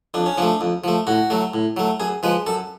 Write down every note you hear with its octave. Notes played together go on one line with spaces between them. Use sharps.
F2 D4
C#4
F3 A3 D4
F2
F3 A3
A2 F#4
F#3 A3
A2
F#3 A3
F#2 G#4
F3 G#3 B4
F#2 A4